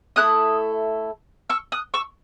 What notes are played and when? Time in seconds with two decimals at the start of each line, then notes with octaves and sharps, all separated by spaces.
0.16 A3 C#4 E4 A4 D#6 F#6
1.50 C#6 E6
1.72 D#6 F#6
1.94 C#6 E6